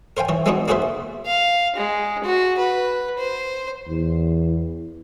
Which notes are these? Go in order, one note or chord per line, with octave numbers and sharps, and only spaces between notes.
A#4 C5 F5 G5 G#5
E3 C#5
G#3 B3 C4 D4 D#4 F#4
A#3 F#4 G#4 B4 C5 E5
F5
G#3
F#4
B4
C5
E2